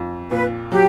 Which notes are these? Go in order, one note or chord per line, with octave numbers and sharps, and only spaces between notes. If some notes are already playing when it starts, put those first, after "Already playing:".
Already playing: F2
A#2 B4
F#3 G4